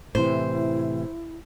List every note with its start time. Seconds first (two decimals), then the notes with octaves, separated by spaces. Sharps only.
0.15 A2 C3 E3 E4 C5